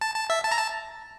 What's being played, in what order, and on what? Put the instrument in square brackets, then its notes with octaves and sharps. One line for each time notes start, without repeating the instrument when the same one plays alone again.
[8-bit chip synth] A5
A5
E5
A5
A#5
A5